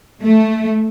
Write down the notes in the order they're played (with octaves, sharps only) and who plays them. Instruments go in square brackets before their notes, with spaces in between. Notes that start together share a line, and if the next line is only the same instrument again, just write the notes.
[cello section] A3